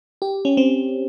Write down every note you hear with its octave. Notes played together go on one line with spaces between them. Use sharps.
G4
C#4
C4